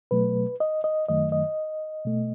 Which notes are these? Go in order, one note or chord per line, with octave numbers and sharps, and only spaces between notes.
B2 F#3 A3 B4
D#5
D#5
F#2 D#3 F#3 A3 D#5
D#5
B2 A3